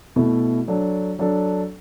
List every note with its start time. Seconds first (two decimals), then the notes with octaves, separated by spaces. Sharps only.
0.16 B2 A3 E4
0.68 F#3 D4 A4
1.19 F#3 D4 A4